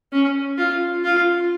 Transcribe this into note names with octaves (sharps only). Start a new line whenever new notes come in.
C#4
F4
F4